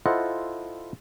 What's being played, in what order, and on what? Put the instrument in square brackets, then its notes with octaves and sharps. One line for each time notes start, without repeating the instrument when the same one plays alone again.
[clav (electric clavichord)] E4 F4 A4 C5 D#5 F#5